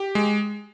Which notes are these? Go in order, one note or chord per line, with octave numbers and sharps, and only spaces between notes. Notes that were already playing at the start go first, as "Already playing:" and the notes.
Already playing: G4
G#3